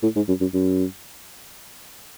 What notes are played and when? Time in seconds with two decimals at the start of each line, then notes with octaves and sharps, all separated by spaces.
0.03 A2
0.16 G#2
0.28 F#2
0.41 F#2
0.54 F#2